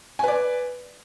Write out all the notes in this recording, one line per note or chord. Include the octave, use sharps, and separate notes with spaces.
B4 D5 G#5